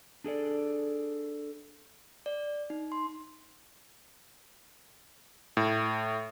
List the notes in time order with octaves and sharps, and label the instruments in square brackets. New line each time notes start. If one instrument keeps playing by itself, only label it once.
[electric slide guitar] D4 G#4 A4 D5
[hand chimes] D5
D#4
C6
[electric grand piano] A2